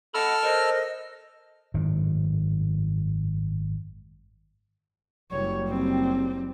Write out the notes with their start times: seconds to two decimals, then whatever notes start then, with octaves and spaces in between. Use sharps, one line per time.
0.14 A4 D#5 F#5 B5 E6 F6
0.43 A#4 C5 D#5
1.74 G#1 F#2 A2 D#3
5.31 F#1 G3 C#5
5.68 C4